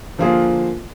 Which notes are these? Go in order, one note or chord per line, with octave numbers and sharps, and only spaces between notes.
D3 F3 A#3 F4 G#4